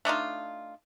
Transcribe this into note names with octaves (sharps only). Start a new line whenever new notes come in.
A3 D4 D#4 F4